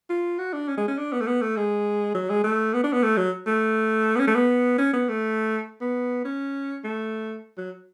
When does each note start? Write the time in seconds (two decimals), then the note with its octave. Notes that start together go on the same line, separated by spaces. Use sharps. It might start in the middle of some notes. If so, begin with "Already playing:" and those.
0.09 F4
0.38 F#4
0.53 D4
0.68 C#4
0.77 G#3
0.88 C#4
0.98 D4
1.12 B3
1.21 A3
1.27 B3
1.41 A3
1.57 G#3
2.14 F#3
2.29 G#3
2.44 A3
2.73 B3
2.83 D4
2.93 B3
3.03 A3
3.17 F#3
3.46 A3
4.15 B3
4.19 C#4
4.27 A3
4.35 B3
4.78 C#4
4.93 B3
5.09 A3
5.81 B3
6.25 C#4
6.84 A3
7.58 F#3